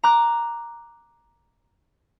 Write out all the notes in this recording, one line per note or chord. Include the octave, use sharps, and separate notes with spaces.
A#5 D6 F#6